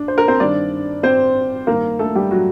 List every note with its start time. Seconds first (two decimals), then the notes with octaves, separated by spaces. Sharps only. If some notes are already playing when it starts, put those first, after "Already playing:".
Already playing: D4
0.08 C5
0.18 A#4
0.28 C4 C5
0.40 G2 D#3 D4 D5
1.03 C4 C5
1.67 G2 D#3 A#3 A#4
1.99 A3 A4
2.15 G3 G4
2.31 F#3 F#4